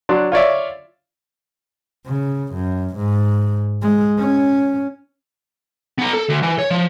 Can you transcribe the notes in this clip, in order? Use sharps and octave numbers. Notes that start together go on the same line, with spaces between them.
F#3 D4 C6
F4 C#5 D5 E5
C#3
F#2
G#2
G#3
C#4
B3 A#5
A4
D2
E3
C#5
F3